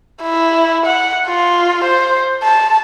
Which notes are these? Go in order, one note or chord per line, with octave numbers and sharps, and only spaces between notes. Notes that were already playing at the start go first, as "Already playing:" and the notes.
E4
F#5
F4
C5
A5